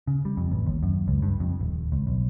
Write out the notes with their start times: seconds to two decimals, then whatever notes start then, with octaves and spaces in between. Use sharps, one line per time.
0.07 C#3
0.25 G3
0.37 F2
0.52 A1
0.67 D#2
0.83 F#2
1.08 C#2
1.22 G2
1.40 F2
1.61 D#1
1.92 C#2
2.07 B1